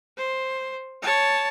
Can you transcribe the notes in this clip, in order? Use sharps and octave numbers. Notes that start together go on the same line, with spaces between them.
C5
C#5 A5